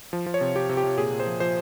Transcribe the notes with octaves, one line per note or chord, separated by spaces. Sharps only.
F3
F3
C#5
C3
C3 G4
C3
G4
C3
A#2 G#4
A#2
C5
F3
F3 C5